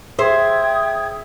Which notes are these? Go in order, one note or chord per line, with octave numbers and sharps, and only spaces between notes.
G#4 C5 E5 G5 D#6 G#6